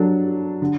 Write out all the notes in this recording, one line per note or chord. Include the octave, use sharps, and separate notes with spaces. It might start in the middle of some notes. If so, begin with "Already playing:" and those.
Already playing: F#3 D4 A4
D3